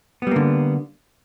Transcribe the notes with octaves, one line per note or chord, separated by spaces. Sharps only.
D3 G3 A#3 B3